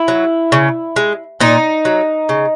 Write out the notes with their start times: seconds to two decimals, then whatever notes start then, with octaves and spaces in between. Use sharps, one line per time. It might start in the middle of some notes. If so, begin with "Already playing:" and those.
Already playing: E4
0.08 F#3
0.52 C#3
0.96 G#3
1.40 A#2 D#4
1.85 F#3
2.29 C#3